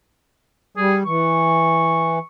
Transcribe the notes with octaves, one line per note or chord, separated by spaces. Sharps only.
G3 G#4
E3 C#6